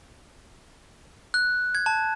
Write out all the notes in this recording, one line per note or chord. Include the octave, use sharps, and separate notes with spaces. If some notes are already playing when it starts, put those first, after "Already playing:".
F#6
G#6
A5